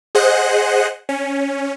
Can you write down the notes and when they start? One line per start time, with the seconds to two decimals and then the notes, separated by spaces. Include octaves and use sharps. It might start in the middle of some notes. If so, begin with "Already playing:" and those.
0.15 G#4 C5 D#5 F#5 F#6
1.09 C#4